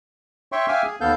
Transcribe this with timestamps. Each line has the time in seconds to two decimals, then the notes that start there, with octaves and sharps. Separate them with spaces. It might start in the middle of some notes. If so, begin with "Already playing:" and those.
0.52 C#5 E5 G5 C6 C#6
0.68 E5 F5 G5 G#5 D6 F6
0.83 G#4
1.01 D#2 B3 A4 F5 G6